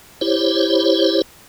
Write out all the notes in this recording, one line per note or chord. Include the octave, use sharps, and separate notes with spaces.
E4 G4 C5 C#5